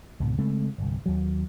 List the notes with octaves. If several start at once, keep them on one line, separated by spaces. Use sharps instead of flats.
C#2 G#2 B2
C#3 G#3 A3 C4
G1 C2
D#2 F#3